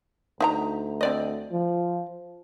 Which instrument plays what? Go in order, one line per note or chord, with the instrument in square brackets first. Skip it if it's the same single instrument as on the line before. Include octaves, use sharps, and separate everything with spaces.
[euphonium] D2 [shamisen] D#4 E5 A#5
[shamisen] C4 D5 D#5
[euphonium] F3